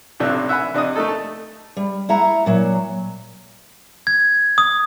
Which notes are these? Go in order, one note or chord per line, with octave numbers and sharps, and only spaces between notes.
B1 A2 C3 D4 F#6
E5 F#5 G#5 B5
C3 D4 D#5 D#6
A3 D#4 A4
A5
G3
E4 E5 F#5 A#5
A#2 F#3
G#6
D#6